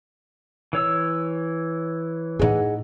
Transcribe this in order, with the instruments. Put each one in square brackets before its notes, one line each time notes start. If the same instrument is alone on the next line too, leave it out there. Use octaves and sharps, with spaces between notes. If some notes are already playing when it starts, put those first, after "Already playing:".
[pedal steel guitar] E3 C#5 E6
[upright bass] A2 D#4 [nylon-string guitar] G#4 D#5 F#5